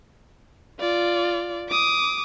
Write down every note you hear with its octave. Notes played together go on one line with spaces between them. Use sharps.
F4 D5
D6 D#6